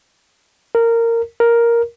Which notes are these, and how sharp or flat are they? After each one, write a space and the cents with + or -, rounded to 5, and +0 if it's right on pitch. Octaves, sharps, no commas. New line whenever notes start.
A#4 -15
A#4 +5